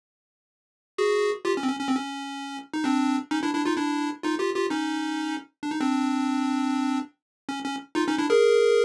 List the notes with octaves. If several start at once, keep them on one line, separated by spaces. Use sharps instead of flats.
F#4 G#4
F4 G4
C#4
C4
C#4
C#4
C4
C#4
D#4
C4 D4
C#4 D#4
D4 E4
D4 E4
D#4 F4
D4 E4
D#4 F4
F4 G4
F4 G4
C#4 D#4
D4
D#4
C4 D4
C#4
C#4
D#4 F4
C#4 D#4
D4 E4
G#4 A#4